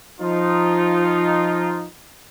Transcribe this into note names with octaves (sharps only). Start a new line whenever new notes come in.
F3 D#4 F4